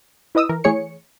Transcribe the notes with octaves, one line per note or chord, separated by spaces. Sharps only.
E4 B4 D#5 D#6 E6
E3 A#4
E3 A3 G#4 C#5 C#7